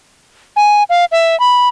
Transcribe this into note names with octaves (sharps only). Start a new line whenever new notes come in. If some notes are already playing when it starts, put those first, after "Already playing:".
G#5
F5
E5
B5